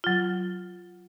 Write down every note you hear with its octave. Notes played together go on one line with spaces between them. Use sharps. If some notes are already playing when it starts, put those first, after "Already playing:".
F#3 F4